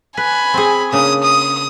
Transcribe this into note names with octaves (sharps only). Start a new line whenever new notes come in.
B4 G#5 B5
C4 G#4
C#3 A#3 D4 D#6
D#6